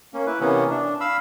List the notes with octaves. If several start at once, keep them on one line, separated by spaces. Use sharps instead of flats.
A#3 C#4
E4 B4
C3 E3 A#3 B3 C#4
D4
F5 B5 E6